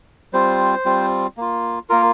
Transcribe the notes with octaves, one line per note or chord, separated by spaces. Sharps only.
G3 C4 F4 C5
G3 C4 F4
A#3 F4
A#3 F4 A#4